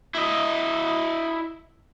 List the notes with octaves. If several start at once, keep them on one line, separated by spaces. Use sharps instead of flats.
E4 D#5